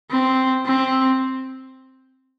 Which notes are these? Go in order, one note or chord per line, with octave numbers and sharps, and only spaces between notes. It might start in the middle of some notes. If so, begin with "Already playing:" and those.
C4
C4